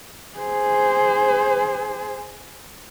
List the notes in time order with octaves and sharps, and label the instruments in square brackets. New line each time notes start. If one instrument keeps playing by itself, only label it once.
[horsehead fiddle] G#4 C5